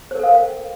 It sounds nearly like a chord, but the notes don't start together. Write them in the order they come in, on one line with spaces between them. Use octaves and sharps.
C5 A#4 A4 F5 G5